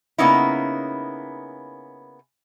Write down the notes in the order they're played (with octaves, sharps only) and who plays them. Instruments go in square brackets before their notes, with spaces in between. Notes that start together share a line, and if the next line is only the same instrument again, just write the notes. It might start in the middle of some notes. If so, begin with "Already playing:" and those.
[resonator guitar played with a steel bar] C#3 A#3 B3 C#4 D#4 E4